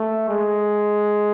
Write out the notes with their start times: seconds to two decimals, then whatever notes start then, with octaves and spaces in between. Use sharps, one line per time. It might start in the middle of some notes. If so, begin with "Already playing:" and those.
Already playing: A3
0.29 G#3